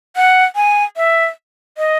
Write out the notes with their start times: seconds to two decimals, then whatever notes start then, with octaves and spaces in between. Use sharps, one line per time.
0.16 F#5
0.56 G#5
0.97 E5
1.78 D#5